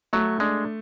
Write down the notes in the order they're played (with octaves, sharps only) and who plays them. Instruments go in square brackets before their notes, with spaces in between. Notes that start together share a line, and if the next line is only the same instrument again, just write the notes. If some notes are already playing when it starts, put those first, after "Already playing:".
[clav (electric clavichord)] F#3 [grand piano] A3
[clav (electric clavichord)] G#3 [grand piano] D4